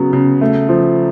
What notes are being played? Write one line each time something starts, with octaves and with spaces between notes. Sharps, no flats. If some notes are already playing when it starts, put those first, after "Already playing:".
Already playing: C#3 F#3 B3
C#3
A3
F3